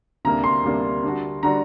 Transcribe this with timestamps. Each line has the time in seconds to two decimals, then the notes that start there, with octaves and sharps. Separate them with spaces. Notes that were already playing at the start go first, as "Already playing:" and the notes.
0.25 D2 C3 G3 A#3 D4 A#5
0.44 C6
0.64 D2 C3 G3 A#3 D4
1.03 D3 G3 D4 F#4
1.43 D3 G3 D4 F#4 A#5